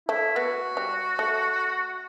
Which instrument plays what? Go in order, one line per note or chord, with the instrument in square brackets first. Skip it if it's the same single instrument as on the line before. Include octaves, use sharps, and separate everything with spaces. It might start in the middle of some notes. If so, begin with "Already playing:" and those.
[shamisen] A3 [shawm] E4
[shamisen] B3 [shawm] F#4
[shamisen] G3
A3